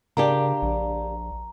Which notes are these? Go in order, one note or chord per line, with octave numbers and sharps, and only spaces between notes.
C#3 A#3 D4 G4 A#5
A#1